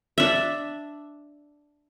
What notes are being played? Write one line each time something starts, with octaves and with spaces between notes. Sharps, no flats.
D4 E5